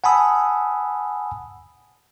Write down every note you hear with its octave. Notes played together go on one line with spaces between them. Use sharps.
F#5 G#5 A5 B5 D#6 E6